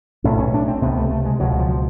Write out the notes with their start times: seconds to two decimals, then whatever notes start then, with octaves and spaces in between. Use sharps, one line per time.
0.24 B1 A2 C#4
0.38 C#4
0.54 D4
0.68 C4
0.82 C#2 C3 B3
0.97 A3
1.11 A3
1.25 G#3
1.40 C#2 B2 F#3
1.59 F3